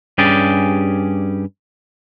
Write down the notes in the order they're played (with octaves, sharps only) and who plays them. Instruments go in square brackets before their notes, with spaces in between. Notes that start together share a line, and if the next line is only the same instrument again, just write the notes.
[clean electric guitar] G2 C#4 G4 G#4 D5